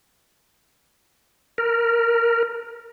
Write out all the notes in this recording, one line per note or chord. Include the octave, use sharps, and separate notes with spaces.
A#4